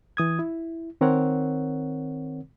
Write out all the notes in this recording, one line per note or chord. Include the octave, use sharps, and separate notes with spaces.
E3 D#6 G#6
E4
D#3 C4 A#4 C#5 F#5